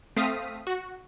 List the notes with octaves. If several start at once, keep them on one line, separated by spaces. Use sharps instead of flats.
A3 C4 F5 D#6 B6
F#4